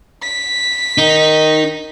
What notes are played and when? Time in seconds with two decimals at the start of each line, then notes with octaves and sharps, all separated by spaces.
0.23 B6
0.98 D#3 D#4